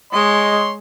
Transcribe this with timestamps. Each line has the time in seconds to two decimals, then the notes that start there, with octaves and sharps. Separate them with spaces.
0.13 G#3 C#5 D#5 C6